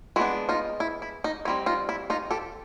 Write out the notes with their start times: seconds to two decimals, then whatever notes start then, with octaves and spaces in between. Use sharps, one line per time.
0.16 G#3 E4 F#4
0.19 B3 D4
0.49 D#4 F4
0.80 E4
1.02 E4
1.24 D#4
1.45 G3 C4 D#4 E4
1.66 D#4 F4
1.89 E4
2.10 D#4 F4
2.31 G4 A4